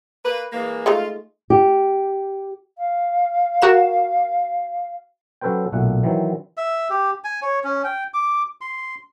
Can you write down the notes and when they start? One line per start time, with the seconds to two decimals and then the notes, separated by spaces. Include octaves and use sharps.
0.25 A#3 B4
0.53 E3 G#3 A#3
0.86 G#3 A3 D#4 F4
1.50 G4
2.77 F5
3.62 F#4 A#4 E7
5.41 F#3 C#4 A4 B4 C5 G5
5.72 B1 A#2 A3 F#5
6.03 D#3 E3 F#3 C4
6.57 E5
6.90 G4
7.24 G#5
7.42 C#5
7.64 C#4
7.84 G5
8.14 D6
8.61 C6